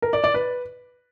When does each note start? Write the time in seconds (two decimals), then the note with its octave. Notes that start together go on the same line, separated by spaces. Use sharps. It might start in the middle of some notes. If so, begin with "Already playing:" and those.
0.02 A#4
0.13 D5
0.24 D5
0.34 B4